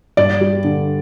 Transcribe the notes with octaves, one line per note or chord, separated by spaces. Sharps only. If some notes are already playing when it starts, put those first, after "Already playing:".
G2 D5
G3
D3